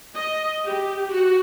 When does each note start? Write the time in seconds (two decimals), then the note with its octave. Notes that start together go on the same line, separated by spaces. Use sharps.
0.16 D#5
0.66 G4
1.10 F#4